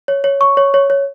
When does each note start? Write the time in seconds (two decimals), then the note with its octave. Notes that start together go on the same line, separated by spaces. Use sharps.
0.08 C#5
0.24 C#5
0.41 C#6
0.57 C#5
0.74 C#5
0.90 C#5